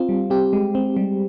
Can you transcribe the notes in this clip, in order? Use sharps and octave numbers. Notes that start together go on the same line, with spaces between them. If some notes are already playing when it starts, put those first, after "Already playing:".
Already playing: C4 F4
G3
C4 G4
G#3
C4
G3